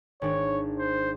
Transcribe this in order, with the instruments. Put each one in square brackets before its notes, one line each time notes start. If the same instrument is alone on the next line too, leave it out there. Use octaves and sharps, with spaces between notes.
[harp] G#1 D4 G#6 [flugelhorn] C#5
[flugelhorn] C5